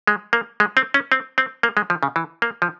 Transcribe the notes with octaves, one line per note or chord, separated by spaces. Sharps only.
G#3
A#3
G#3
C4
C#4
C4
C4
A#3
G#3
F3
C#3
E3
A#3
F3